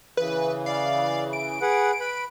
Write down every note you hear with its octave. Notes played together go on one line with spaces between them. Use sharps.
C#3 E3 B4
D5 F5
D7
G#4 B4 F#5
B4 B5